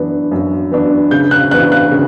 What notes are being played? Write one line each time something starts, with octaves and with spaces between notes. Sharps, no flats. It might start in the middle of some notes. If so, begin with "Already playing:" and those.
Already playing: F#2 E3 B3 D4
F#2
E3 B3 D4
C#3 G6
F#6
E3 B3 D4 F#6
F#6
C#3